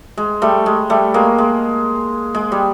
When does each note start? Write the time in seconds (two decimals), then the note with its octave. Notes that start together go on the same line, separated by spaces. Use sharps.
0.18 G#3
0.42 G3 A3
0.66 G#3
0.90 G3 A3
1.14 G#3 A#3
1.38 G#3
2.35 G#3
2.52 G3